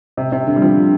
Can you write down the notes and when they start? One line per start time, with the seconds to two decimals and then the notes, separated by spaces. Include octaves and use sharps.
0.17 C3
0.32 C3
0.47 D3
0.56 G3
0.62 F3
0.77 D3